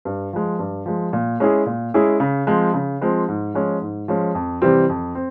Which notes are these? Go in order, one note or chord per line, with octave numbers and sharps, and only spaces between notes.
G2
F3 G#3
G2
F3 G#3
A#2
G#3 C#4 E4 G#4
A#2
G#3 C#4 E4 G#4
C#3
F3 G#3 C4 F4
C#3
F3 G#3 C4 F4
G#2
F3 G#3 C#4
G#2
F3 G#3 C#4
F2
C3 E3 G3 C4
F2
C4